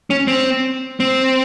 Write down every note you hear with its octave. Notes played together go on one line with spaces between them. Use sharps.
C#4
C4
C4